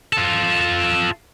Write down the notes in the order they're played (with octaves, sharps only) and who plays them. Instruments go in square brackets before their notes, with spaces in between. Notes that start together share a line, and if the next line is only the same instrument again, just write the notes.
[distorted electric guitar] F4 A4